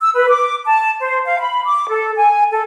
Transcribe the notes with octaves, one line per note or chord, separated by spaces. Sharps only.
E6
B4
D6
A5
C5
F5
B5
D6
A4
G#5
A4